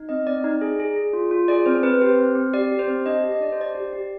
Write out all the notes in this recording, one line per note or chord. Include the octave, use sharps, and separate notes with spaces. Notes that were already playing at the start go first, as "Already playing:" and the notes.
Already playing: D#4
C4 D#5
C4 D5
D#4
G#4
G#4
G#4
F4
F4
G#4 D5
C4 C5
C4 B4
G4 C5
C4
C4
G4 D5
G4
C5
C4
D4 D#5
G4
D#5
D4 D5
C5
G4 D5
G4
G4